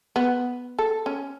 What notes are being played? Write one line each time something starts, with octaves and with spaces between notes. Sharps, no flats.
B3
A4
C#4